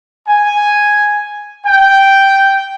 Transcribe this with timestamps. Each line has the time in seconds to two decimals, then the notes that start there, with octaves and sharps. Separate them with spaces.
0.27 G#5
1.66 G5